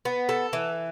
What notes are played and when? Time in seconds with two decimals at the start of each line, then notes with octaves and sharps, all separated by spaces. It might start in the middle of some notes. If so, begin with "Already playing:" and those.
0.05 B3
0.29 A4
0.53 E3